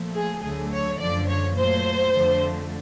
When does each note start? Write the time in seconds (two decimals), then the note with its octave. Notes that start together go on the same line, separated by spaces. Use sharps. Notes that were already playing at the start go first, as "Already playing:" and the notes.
Already playing: A#2 F3 A3
0.14 G#4
0.42 D2 D3 F#3 A3 G#4
0.71 C#5
0.99 F#2 D3 F3 D5
1.27 C#5
1.56 A#2 F#3 A3 C5
2.13 F2 D3 F3 A3